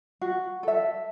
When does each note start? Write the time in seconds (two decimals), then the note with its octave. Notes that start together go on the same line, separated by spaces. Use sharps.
0.21 F#4
0.63 A4 E5